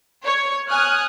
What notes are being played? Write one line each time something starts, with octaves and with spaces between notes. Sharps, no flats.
C#5
G#5 D#6 F6 F#6